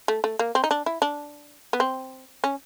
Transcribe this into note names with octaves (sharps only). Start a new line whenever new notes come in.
A3
A3
A#3
C4
D#4
D4
E4
D4
B3
C4
C#4